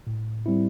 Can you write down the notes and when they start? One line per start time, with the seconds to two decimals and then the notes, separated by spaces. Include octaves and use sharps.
0.07 A2
0.46 G3 C4 E4